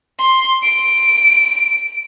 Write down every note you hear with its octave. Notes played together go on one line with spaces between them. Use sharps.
C6
D7